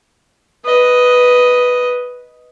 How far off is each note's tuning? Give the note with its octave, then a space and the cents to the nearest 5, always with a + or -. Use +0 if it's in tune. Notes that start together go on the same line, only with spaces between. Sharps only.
B4 +0 D#5 +5